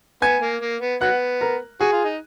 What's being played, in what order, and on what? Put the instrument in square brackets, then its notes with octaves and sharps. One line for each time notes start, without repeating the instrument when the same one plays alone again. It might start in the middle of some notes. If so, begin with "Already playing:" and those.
[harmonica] B3 [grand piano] G#5 G#6
[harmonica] A#3
A#3
B3
[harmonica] F#3 B3 [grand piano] F#5 F#6
[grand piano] A#4 A#5
[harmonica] F#4 [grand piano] G#4 G#5
[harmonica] F4
D#4